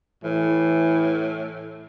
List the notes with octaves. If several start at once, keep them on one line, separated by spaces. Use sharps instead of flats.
A2 E3